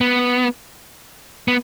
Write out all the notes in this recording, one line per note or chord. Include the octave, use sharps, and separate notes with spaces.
B3
B3